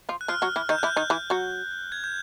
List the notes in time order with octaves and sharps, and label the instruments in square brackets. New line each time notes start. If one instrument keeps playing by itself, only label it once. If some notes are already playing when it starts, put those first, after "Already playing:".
[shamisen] F3 F4
[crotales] F#6
[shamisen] F3 F4 [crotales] F6
[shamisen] F#3 F#4
E3 E4
[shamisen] D#3 D#4 [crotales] G6
[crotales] F#6
[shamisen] E3 E4
[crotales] G6
[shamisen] D#3 D#4
E3 E4
F#3 F#4
[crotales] G#6
G6